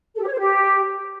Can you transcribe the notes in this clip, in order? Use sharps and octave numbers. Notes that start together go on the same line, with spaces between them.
A4
G4
C#5
C5
G4